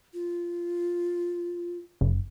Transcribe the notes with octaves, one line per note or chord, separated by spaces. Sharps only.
F4
F#1